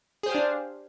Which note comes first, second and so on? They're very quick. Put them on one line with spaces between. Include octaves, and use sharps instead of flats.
G#4 C5 G4 F5 D4